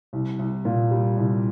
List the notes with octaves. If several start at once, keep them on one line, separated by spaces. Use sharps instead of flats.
C2
C2
A#2
G3
C2